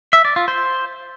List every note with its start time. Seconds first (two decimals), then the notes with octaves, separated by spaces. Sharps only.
0.13 E5
0.25 D5
0.36 F4
0.48 C5